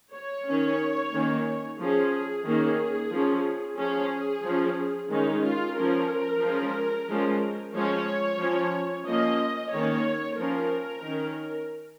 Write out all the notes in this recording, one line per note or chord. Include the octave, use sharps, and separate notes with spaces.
C#5
D#3 C#4
D#3 A#3 C#4
F3 C#4 G#4
D#3 A#3 C#4 G#4
F3 C#4
F3 C#4 G#4
F3 C#4
D#3 G#3 C#4 D#4
F4
F3 C#4 A#4
F3 G#3 C#4
F3 G#3 C#4
F3 G#3 C#4 C#5
F3 C#4
F3 A#3 C#4 D#5
D#3 A#3 C#4 C#5
F3 C#4 A#4
D#3 C#4